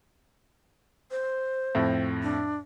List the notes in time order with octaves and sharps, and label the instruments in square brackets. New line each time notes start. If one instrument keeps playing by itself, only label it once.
[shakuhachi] C5
[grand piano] F2 A2
[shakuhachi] D4